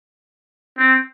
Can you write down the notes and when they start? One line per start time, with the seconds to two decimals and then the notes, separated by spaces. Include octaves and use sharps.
0.78 C4